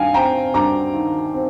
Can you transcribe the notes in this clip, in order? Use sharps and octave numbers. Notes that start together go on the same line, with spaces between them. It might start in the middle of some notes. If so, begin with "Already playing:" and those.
Already playing: G2 D#3 F5 G5 G#5
C4 G5 A#5
G2 A#5 D6
D#3
C4